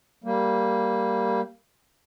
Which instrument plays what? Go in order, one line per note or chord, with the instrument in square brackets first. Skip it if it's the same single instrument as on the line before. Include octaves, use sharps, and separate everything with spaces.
[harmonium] G3 A#3